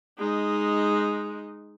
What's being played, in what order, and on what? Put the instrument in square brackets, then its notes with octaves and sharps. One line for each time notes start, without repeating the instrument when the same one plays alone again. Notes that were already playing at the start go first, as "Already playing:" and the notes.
[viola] G#3 D#4